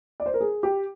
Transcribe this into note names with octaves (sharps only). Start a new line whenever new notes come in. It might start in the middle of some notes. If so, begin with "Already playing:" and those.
D5
C5
A#4
G#4
G4